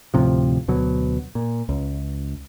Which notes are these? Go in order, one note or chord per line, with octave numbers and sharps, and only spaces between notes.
D2 A2 C3 F3
D2 B2 F#3
A#2
C#2